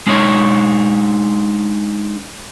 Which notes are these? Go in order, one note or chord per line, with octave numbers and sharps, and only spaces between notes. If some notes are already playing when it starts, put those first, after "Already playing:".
G#3 D4 D#4 C#5